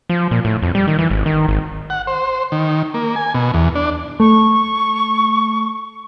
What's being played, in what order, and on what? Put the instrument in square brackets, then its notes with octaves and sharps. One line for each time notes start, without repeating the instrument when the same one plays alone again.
[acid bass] F3
A#2
A2
F2
G3
D#3
E3
G#1
D#3
G#1
[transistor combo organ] F#5
C5
D#3
A#3
G#5
B2
E2
D4
[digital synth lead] A3 [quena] C#6